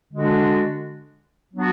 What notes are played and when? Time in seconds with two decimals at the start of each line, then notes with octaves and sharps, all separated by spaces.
0.13 D3 G#3 D4 F#4
1.54 F#3 B3 D4 F#4